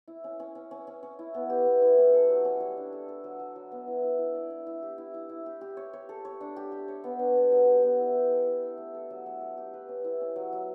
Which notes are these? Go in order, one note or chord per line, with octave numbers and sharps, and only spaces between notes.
E4
C#4
C#4
C#4
C#4
C#4
C#4
E4
B3
G4
B3
E4
C#4
A4
F#3
C#4
G3
D4
A4
A4
F#3
F#3
F#3
B3
E4
E4
E4
D5
E4
E4
G4
E4
E4
E4
G4
G4
C#5
C#5
A4
C#5
D4
G4
G4
C#5
B3
D4
B3
F#3
G4
B3
E4
G4
A4
E4
E5
A3
A4
F#3
A3
A3
G4
B4
C#4
E4
C#4
F#3
F#3